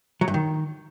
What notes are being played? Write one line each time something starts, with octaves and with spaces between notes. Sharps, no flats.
F#3
G2
D#3